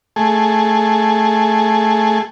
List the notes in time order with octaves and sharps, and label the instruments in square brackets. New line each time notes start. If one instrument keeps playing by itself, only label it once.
[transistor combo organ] A3 G#4